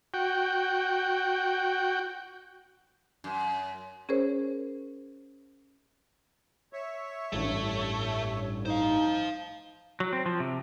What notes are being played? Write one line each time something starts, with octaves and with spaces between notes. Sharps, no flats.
F#4 G5
F#2
C#4 G#4 A#4 C5 C#5
C#5 E5
A1 G2 A3
D#4 C5 F5
F#3
C4
F3
C3